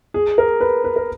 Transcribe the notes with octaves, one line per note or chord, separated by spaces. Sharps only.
G#4
A#4
B4
B4
A#4